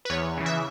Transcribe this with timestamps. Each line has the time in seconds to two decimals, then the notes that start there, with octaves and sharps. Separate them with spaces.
0.05 B4
0.10 E2 C#5
0.37 C#3 E3
0.46 E5